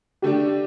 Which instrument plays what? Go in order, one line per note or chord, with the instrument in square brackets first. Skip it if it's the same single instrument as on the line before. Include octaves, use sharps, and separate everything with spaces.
[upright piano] D3 A3 D4 [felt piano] G4